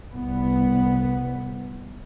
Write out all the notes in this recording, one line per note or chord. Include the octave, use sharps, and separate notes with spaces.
C2 B3